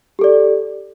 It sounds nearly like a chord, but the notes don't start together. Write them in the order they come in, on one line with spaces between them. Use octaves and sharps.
G4 A4 D5